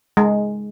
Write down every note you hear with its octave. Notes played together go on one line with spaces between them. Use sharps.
G#3